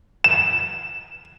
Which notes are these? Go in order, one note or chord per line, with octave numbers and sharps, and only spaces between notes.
E7